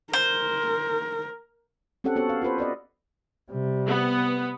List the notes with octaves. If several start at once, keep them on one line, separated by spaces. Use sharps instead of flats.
A#4 C5
C4 C#4 G4 A4 F#5
B3 F#4 A4 C#5
F5
F4 A4 B4 C5
B4 D5 D#5
C3 G3
B3